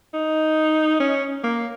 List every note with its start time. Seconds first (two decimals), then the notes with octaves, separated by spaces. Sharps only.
0.14 D#4
1.00 C#4
1.44 A#3